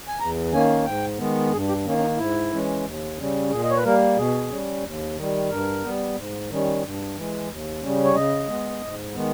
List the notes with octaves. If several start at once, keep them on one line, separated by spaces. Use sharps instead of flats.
G#5
E2 A#5
D#3 A#3 C#4 G#5
G#2 G5
D#3 G#3 B3
G2 G#4
G4
D#3 A#3 C#4
C#4
D#4
G#2 E4
E3 G#3 C#4
D#2
C#3 G3 C#4
A#2 G#4
D#5
C#5
B4
G3 A#3 A#4
B2 G#4
G3 C#4
D#2
D#3 G3
G2 A#4
G3 B3
G#2
D#3 G3 C#4
G2
E3 G#3
D#2
C#3 G3 C#4
C#5
C#3 D#5
G#3 B3
G#2
D#3 G#3 B3